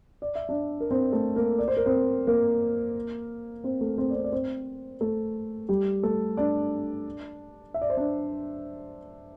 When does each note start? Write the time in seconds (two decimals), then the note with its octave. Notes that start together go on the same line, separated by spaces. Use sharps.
0.22 D5
0.35 E5
0.49 D4 D5
0.80 A#4
0.91 C4 C5
1.13 A3 A4
1.36 A#3 A#4
1.59 D5
1.68 C5
1.77 A#4
1.86 C4 C5
2.27 A#3 A#4
3.64 C4 C5
3.81 A3 A4
3.98 C4 C5
4.10 D5
4.15 C4 C5
4.24 D5
4.32 C4 C5
5.01 A3 A4
5.69 G3 G4
6.03 A3 A4
6.37 D4 D5
7.74 E5
7.82 D5
7.90 C5
7.97 D4 D5